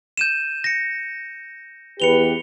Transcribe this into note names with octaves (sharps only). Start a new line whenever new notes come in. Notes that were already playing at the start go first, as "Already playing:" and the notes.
G6 D#7 E7
A#6 C#7
E2 G4 B4 C#7 F7 G7